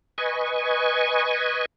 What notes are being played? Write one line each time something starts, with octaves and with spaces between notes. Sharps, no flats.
B4 D#5 G#5 C#6